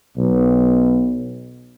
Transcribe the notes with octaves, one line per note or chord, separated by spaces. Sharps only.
B1 B3